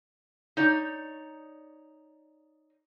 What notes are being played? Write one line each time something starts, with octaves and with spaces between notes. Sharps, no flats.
D#4 C#5 D5